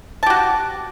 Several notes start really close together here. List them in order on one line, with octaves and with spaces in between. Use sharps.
A5 G4 F#4